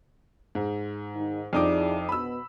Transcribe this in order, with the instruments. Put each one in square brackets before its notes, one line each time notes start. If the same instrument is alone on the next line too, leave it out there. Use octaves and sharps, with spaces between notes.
[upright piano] G#2
[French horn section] D#3 G#3 D#4
[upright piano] F2 D#4 D6 [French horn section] E4 G#4 D5
[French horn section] B2 [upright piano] B5 E6